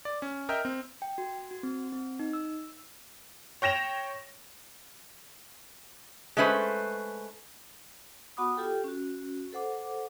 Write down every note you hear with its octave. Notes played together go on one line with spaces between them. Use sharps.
D5
C#4
A#4 D#5 E5 G5 F6 G6
C4
G5
F#4
F#4
C4
C4
D#4
E6
C#5 G5 A#6 E7 F7
G#3 A3 C#4 B4 C5
B3 F#4 F#5 B5 D6 D#6
F4 G4 A4 G5
C#4 F#4
A4 C5 F#5 D6